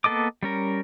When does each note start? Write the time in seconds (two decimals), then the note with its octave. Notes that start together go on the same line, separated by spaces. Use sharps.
0.04 A#3 B3 A4 D#5 D6
0.43 G3 C#4 A#4